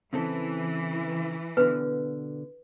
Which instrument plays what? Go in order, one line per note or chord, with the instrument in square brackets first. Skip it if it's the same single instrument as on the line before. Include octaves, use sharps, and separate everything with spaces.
[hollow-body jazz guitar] C#3 C4 A4 [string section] E3
[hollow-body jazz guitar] B2 D3 [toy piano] B4